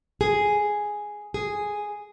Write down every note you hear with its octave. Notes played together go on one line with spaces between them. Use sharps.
G#4
G#4